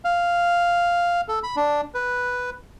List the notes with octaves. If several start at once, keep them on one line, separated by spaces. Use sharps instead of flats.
F5
A4
B5
D4
B4